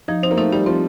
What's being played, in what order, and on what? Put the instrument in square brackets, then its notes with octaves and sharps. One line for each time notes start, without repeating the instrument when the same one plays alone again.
[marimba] F3 [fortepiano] D#4
[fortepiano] C4 [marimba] D#4
[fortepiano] A#3
[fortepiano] A3 [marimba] D#4
[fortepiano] G3 [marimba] D#4
[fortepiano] F3 [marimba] C4